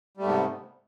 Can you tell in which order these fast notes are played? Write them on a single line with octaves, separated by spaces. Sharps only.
G3 A3 G#2 B3 C3